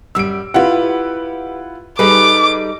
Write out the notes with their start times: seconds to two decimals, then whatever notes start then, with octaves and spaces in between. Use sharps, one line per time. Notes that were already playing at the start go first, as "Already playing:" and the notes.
0.15 F#2 G3 E6 D7
0.54 E4 F4 G4 B4 F#5
1.99 G3 D#4 G#4 A4 B4 D6